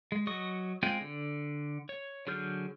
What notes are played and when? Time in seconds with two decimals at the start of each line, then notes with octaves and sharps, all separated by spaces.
0.12 G#3
0.27 F#3 D#5 C#6 D#6
0.83 G#3 C4 F4 G5 G#5
1.01 D3
1.89 C#5
2.27 D3 F#3 G#4 F6 G6